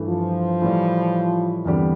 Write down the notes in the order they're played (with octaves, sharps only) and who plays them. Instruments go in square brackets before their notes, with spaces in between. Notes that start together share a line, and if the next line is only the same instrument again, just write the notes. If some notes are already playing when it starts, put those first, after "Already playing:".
Already playing: [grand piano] G2 E3 A3
[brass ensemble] F3
[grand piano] A2 E3 G3
E2 D3 G3 C4 G4